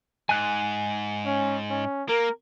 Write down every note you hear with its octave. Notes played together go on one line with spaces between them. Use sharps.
G#2 G#5 F#6
C#4
C#4
A#3 A#4